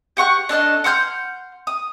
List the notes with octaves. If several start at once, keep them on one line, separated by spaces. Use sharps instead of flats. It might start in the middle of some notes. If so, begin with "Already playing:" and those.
G4 F#5 C#6 F#6
D4 A4 D#5 F6
F#5 C6 F6 G6
D#6